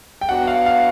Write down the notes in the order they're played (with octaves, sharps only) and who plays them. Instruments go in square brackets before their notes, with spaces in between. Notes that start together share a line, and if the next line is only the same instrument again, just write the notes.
[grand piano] G5
[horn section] F#3 B3 D4 F#4 [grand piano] F#5
[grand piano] F5
F5